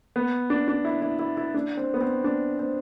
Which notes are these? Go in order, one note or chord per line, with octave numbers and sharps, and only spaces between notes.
B3
D4
D4
E4
E4
E4
E4
D4
C4
B3
C4
D4
C4